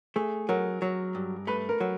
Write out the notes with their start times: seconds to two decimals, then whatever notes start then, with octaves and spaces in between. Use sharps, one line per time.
0.16 A3 G#4
0.49 F#3 A#4
0.82 F#3
1.15 G2
1.47 A3 B4
1.69 A#4
1.80 F#3